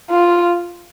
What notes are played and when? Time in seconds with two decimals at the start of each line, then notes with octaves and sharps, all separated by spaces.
0.10 F4